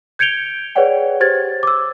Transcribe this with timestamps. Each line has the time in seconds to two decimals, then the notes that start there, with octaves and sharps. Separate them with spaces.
0.19 G6 G#6 C#7 D7 F7 G7
0.75 G#4 B4 C#5 D5 F#5 G5
1.20 G4 C5 G#6 A6
1.63 D6 E6